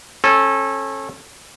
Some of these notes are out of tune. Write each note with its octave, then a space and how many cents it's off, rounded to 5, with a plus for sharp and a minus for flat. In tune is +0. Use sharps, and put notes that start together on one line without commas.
C#4 -30 A4 -10